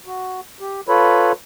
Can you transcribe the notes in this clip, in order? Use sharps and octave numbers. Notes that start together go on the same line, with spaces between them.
F#4
G4
F4 A4 B4 C#5 B5